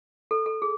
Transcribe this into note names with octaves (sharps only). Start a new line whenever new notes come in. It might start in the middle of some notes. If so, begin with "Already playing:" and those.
A4
A4
G#4